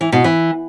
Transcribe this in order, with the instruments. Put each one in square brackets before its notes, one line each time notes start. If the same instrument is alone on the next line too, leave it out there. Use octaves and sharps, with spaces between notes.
[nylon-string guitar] E3
B2
E3